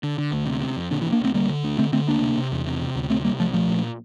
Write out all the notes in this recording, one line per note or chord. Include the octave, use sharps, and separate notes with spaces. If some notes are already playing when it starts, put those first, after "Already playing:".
D3
D3
D2
C3
C3
F2
A#2 D3
E3
A#2
A#3 D4
C2 A3 C4
D3 G3 A#3
D3
D2
D3 A3 C4
D3 A3 C4
D2 A#3 D4
C3
C3
E2
C3
C3
D2
C3 A3 C4
C3 G3 A#3
C2 F3 A3
A#2 F3 A3
A#2